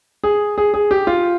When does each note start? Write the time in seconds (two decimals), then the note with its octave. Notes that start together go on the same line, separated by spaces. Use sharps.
0.24 G#4
0.58 G#4
0.74 G#4
0.91 G4
1.07 F4